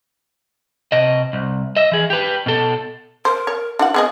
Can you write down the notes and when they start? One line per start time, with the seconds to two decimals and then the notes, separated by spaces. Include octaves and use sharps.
0.92 C3 D#5
1.33 C2
1.76 D#5 E5
1.92 E3 G#4
2.10 G4 B4
2.46 B2 A4
3.25 A#4 C5
3.47 C#5
3.79 D4 E4 F#4 F#5
3.94 B3 G#4 A#4 D#5